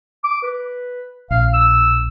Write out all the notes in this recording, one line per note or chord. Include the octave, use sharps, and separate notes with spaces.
D6
B4
A#1 F5
E6